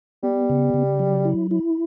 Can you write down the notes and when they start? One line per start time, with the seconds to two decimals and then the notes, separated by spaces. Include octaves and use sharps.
0.23 G3 B3
0.50 C#3
0.74 C#3
0.99 F#3
1.25 E4
1.51 E4